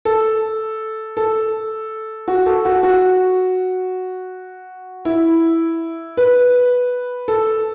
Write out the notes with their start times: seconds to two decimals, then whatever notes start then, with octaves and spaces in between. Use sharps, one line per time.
0.05 A4
1.17 A4
2.28 F#4
2.46 A4
2.65 F#4
2.83 F#4
5.05 E4
6.17 B4
7.28 A4